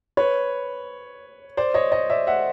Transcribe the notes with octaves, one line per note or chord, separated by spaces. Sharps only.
B4 C#5
C5 D5
C#5 D#5
C#5 D#5
D5 E5
E5 F#5